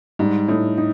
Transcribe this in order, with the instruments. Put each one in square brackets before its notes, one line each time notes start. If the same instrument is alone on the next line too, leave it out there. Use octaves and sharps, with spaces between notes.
[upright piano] G#2 [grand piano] G3
[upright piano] A2 [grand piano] D#4
[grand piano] D#4